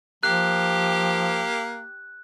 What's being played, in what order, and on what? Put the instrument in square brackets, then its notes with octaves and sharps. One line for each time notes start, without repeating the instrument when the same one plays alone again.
[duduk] F3 [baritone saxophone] A#3 [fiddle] G4 [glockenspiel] F#6